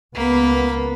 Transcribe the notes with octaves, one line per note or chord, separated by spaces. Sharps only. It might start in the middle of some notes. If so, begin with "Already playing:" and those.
C#2 A#3 B3 B5